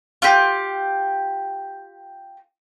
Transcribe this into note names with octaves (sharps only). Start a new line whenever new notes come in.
F4 G4